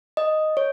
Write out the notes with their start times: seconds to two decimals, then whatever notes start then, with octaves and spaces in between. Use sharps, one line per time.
0.17 D#5
0.57 C#5